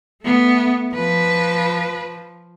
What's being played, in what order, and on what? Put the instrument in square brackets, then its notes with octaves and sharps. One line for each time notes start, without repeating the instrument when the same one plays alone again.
[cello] A3 B3
[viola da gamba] F3 [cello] B4